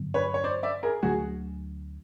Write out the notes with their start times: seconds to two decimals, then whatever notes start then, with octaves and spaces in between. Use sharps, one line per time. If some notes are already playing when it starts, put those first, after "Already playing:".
Already playing: G2 D3 F#3 B3
0.14 B4 C#5
0.34 C#5
0.44 C5 D5
0.63 D5 E5
0.83 G#4 A#4
1.02 D2 D3 F#3 A3 F#4 G#4